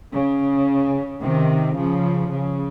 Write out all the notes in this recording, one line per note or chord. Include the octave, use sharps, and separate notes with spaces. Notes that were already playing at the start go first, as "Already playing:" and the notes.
C#3
C3 D#3
C#3 F3
C#3